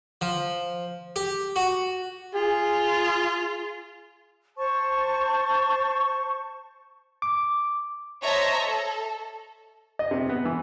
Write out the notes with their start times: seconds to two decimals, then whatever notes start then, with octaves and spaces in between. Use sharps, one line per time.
0.21 F3
1.16 G4
1.56 F#4
2.34 F4 G#4
4.56 C5 A5 C#6
7.22 D6
8.24 C5 C#5 D#5 E5 A5 A#5
8.64 A4
9.99 D#5
10.11 C3
10.29 B3
10.45 E3